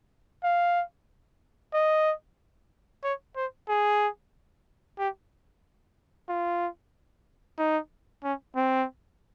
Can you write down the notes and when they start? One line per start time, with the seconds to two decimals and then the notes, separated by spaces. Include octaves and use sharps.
0.44 F5
1.74 D#5
3.03 C#5
3.36 C5
3.68 G#4
4.98 G4
6.29 F4
7.58 D#4
8.23 C#4
8.56 C4